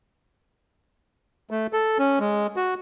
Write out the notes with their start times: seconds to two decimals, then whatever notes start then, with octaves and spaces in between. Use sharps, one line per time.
1.51 A3
1.73 A4
1.99 C#4
2.20 G#3
2.56 F#4